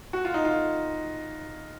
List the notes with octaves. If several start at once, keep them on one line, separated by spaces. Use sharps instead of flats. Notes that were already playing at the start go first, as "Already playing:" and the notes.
F#4
F4
D#4
F4